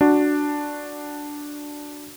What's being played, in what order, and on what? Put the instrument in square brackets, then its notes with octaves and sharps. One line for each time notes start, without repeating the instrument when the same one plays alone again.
[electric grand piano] D4 F#4